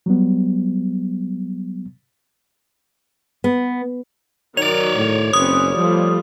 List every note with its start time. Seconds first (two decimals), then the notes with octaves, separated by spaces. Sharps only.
0.06 F#3 G3 B3
3.44 B3
4.57 D#3 F#3 C#5 D5 F7
4.96 A2
5.33 F#1 C4 C#4 B4 D#6
5.77 F3 G3 A3 F4